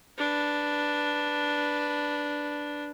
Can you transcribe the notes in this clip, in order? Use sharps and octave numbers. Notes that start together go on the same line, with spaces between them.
D4 B4